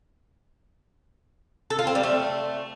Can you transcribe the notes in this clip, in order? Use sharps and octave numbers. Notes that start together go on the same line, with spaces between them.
A4
F4
C4
G3
A3